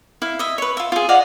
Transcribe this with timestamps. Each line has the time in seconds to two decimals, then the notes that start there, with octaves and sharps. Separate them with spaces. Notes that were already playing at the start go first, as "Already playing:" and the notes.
0.22 E4 F5
0.39 D#5 E5
0.58 B4 C#5
0.77 F4 E5
0.92 F4 G#4
1.09 D5 D#5 F5 F#5